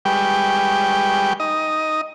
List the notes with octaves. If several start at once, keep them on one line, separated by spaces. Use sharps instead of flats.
G3 G#3 G4 B4 G5 C#6
D#4 D#5